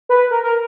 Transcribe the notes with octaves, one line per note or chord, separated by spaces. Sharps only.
B4
A#4
A#4